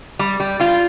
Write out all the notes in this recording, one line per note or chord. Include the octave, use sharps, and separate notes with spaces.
G3
G3
G3 F4